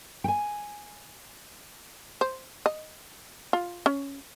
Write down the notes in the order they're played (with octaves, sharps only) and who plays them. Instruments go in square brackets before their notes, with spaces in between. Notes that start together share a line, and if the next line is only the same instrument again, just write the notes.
[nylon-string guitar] G5 G#5
[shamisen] C5
D#5
F4
C#4